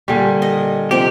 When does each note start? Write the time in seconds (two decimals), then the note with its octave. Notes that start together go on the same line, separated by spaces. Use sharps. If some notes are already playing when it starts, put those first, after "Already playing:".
0.08 A#2 D3 G3 G#5
0.42 D#5
0.91 C3 F3 C4 G4